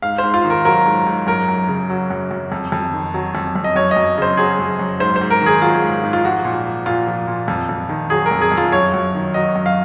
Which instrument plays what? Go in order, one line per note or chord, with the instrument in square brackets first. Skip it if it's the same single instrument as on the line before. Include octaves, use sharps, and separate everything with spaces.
[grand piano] G#2 F5
G#2 C5
F4
D#3
A#4
F#3 A#4
G#2
G#2
F#2 A#4
F#2
C#3
F#3
F#2
F#2
F2
F2
D#3
F#3
F2
F2
D#5
F#2 C#5
D#5
F#2
C#3 C5
F#3 G#4
F#2
F#2
G#2 C5
C5
G#2
A#4
D#3 G#4
F#3 F4
G#2
G#2
F4
F3 F#4
A#2
F3
A#2 F4
F3
A#2
F2
F2
D#3
F#3 G#4
A#4
F2
G#4
F2
F4
F#2 C#5
F#2
D#3
F#3 D#5
F#2
F5